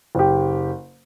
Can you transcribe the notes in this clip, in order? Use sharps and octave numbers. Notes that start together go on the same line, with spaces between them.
F#1 G4